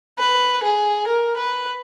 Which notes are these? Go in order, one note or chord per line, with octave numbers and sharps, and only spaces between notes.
B4
G#4
A#4
B4